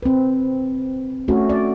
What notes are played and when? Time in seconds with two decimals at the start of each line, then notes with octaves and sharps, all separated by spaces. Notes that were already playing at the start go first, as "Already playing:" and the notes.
0.03 C4 B4
1.28 A3 C#4 F#4
1.49 D5